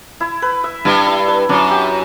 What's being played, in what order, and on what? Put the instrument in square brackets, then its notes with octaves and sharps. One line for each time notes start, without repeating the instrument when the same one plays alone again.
[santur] E4
B4
E5
[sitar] G2 [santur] E4
[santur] E4
B4
[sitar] F#2 [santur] D4
[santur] G4